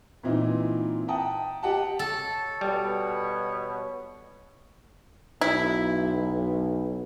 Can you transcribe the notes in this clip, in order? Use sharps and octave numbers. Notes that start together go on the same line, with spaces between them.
A#2 E3 C4 D#4 E4
E5 F#5 G5 A5 A#5 D#6
G4 D#5 F#5 G5 A5
A4 C#5
B2 G3
B1 E4